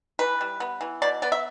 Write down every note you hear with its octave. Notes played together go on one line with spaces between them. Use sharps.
E3 B4
G3
B3
E3
B2 D5
B3 D5
E5